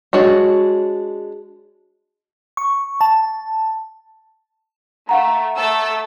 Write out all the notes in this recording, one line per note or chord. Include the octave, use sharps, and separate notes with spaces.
G#3 D4 F#4 C#5
C#6
A5
A3 F5 F#5 A#5
A3 A4 E6